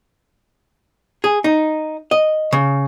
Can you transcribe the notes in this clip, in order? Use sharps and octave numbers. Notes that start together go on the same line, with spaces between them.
G#4
D#4
D#5
C#3